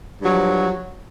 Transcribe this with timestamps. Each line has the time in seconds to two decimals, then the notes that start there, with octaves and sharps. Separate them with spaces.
0.22 G2
0.26 F#3
0.30 F3